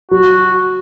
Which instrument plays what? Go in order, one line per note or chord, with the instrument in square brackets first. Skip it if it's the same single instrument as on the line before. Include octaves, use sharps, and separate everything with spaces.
[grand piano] F#3 [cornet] F#4